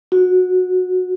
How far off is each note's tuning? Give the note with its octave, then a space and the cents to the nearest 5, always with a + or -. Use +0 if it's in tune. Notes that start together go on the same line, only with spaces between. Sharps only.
F#4 -20